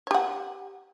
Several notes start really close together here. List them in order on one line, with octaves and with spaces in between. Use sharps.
C#5 G4 F#5